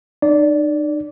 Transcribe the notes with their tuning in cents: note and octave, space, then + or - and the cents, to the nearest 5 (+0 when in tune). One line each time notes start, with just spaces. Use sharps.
D#4 -45 D5 -15